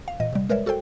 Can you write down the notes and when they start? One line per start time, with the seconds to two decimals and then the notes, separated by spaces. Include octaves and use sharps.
0.08 F5
0.20 A#2 E3 D#5
0.33 C3 G3
0.49 G#3 A#4 B4 C#5 D5 E5
0.66 F#4 A4 A#4 C5 G5